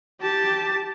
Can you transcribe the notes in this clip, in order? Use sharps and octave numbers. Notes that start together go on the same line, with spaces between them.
G4 A5